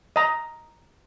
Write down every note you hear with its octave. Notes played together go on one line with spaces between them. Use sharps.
D#5 A#5